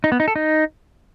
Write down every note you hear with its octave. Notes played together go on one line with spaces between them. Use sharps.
D#4
B3
D#4
A4
D#4